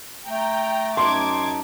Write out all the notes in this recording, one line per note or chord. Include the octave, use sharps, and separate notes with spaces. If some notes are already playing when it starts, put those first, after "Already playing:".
A3 G5 A#5
F#2 D#4 A5 C6 D6 G#6